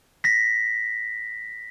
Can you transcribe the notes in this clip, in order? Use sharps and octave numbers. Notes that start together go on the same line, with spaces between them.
A#6 B6